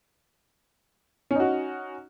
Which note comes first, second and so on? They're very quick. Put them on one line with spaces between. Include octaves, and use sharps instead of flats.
C#4 D#4 F#4